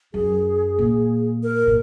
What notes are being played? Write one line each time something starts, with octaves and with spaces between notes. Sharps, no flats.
F#2 G#4
A#2
A#4
A#2